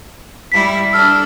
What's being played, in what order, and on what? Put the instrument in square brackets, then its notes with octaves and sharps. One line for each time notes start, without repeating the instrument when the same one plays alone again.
[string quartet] G3 E4 [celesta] B6
[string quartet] D4 A4 [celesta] E6 F6